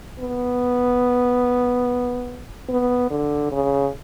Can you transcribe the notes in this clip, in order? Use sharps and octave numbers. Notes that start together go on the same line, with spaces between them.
B3
B3
D3
C#3